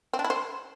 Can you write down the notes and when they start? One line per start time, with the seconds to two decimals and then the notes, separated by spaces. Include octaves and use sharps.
0.13 C4
0.19 D4
0.24 E4
0.30 C5